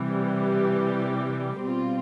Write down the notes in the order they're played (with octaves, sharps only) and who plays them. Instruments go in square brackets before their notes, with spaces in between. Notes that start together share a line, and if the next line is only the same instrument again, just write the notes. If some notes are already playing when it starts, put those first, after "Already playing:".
Already playing: [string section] C3 E3 G3
G4
B2 G3 C4 F4